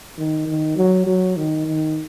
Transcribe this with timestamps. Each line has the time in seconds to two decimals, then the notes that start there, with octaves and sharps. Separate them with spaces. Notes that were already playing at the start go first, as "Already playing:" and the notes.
0.18 D#3
0.47 D#3
0.77 F#3
1.06 F#3
1.36 D#3
1.67 D#3